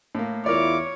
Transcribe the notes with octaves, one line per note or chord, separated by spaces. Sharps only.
A2 A#3
E2 E4 F4 A#4 C#5 D5 D6